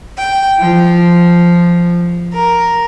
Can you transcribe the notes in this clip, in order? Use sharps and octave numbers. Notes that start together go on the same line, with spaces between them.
G5
F3
A#4